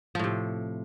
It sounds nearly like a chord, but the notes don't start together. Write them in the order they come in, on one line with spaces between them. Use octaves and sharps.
F3 A2 C3